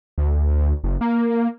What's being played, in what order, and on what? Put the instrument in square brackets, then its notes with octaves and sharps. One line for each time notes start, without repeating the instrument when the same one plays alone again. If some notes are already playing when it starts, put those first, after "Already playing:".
[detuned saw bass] D2
F#1
A#3